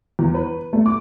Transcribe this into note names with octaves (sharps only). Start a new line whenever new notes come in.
E2
B4
A3
D6